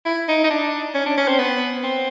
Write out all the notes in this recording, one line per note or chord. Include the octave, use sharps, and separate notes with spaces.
E4
D#4
D#4
D4
C#4
D4
C#4
C4
B3
C4